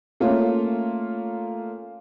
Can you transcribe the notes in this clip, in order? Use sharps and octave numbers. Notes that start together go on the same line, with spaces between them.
A3 A#3 C#4 F4